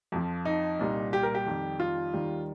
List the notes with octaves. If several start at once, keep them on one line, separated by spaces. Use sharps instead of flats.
F2 F3
D#4
C2 A#2 G3
G4
A#4
G4
F2 D#3 G3
F4
D#2 D#3 G3